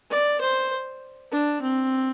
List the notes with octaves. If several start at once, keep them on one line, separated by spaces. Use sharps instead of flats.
D5
C5
D4
C4